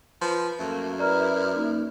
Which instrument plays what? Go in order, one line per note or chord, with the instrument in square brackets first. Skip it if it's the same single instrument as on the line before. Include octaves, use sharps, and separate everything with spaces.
[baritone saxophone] F3 [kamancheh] B4
[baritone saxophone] F#2 [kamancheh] A3 A#3
[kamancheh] E4 [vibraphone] A#4 B4 [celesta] D5 A#5 F6
[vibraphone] A#3 D#4